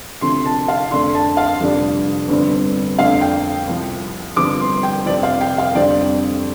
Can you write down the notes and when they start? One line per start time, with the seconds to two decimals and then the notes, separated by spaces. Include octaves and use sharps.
0.21 D2 C3 F3 A3 C6
0.46 A5
0.68 F5
0.91 F2 D3 A3 D4 C6
1.15 A5
1.37 F5
1.61 F1 F2 D3 G3 D4
2.29 G1 G2 G3 C4
2.98 F2 D3 A3 D4 F5
3.21 G5
3.68 C2 C3 F3
4.36 G1 G2 F3 C4 D6
4.60 C6
4.83 G5
5.05 F1 F2 F3 C4 D5
5.23 F5
5.41 G5
5.58 F5
5.75 F2 D3 G3 C4 D5